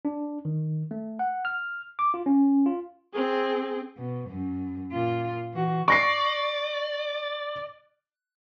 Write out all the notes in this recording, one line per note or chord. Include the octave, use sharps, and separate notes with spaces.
D4
D#3
A3
F#5
F6
D6
F4
C#4
F4
C4 G#4
B2
F#2
A#2 F4
E3 F#4
D5 C#6 A#6 C7